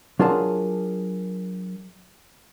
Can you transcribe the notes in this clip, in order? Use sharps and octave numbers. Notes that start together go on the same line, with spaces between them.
F#3 D4 F4 G#4 A#4 A5